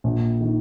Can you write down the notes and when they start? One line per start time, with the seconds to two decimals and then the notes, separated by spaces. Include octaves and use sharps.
0.04 A#1
0.41 D#3